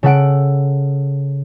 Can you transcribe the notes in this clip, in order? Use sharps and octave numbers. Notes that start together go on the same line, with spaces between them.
C#3 A4 F#5 D7